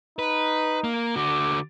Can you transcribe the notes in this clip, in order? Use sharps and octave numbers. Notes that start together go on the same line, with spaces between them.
D#4 B4
A#3
D3 F#4 D6